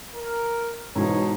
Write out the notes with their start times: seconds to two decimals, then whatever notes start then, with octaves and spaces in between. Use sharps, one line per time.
0.15 A#4
0.96 G#2 B2 E3 G#3 A4 C#5